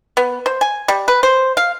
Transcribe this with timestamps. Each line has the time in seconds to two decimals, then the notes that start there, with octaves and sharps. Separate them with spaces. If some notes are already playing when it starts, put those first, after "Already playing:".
0.17 B3
0.46 C5
0.61 G#5
0.88 G3
1.08 B4
1.23 C5
1.57 F5